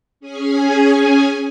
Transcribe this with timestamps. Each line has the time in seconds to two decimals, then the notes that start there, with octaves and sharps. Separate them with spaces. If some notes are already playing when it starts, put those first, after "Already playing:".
0.20 C#4 G#4 G#5